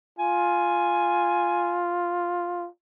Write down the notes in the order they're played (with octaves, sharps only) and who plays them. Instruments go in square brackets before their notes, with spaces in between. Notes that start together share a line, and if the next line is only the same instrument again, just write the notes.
[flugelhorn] F4 [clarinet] G#5